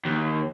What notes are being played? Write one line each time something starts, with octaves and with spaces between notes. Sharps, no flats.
D#2